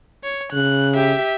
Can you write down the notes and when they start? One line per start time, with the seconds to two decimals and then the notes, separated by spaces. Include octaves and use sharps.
0.24 C#5
0.53 C#3 F#6
0.95 G4 E5